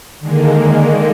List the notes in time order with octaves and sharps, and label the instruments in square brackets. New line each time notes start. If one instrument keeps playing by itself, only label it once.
[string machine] D3 D#3 G#3 A#3